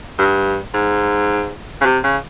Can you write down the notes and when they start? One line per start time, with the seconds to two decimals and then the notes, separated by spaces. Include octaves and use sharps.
0.19 G2
0.74 G#2
1.81 C#3
1.85 C3
2.04 C#3